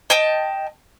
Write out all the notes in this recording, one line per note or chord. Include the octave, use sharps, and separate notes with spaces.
D#5 G5 A5